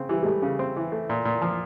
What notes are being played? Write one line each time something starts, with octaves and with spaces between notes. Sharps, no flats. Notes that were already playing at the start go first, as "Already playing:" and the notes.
Already playing: C#3 C4
E3 G3
G#3
G3 A3
C#3
C4
E3
A3
A#2
A#2
F3